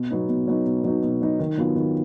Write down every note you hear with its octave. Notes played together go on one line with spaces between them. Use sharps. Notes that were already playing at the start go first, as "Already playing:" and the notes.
Already playing: B2
F#3 B3 D#4
B2
F#3 B3 D#4
B2
F#3 B3 D#4
B2
F#3 B3 D#4
D#3
F#3 B3 F4
D#3